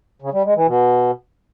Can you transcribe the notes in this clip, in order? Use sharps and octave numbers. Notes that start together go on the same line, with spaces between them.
C#3
G3
G#3
E3
B2